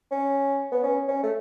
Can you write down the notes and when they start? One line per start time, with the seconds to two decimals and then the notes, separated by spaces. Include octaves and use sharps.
0.11 C#4
0.72 B3
0.83 C#4
1.08 C#4
1.23 A3